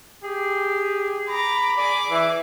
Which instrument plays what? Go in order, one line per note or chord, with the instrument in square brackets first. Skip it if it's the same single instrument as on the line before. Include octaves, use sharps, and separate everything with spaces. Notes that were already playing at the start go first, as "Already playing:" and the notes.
[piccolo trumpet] G4 [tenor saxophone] G#4
[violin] A#5 D6 [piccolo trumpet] B5
[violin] G#4 D6 [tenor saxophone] D5
[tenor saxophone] E3 [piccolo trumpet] E5